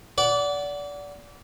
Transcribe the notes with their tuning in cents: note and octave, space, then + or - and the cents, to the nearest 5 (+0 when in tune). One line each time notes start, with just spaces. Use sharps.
D5 -25 F#5 +0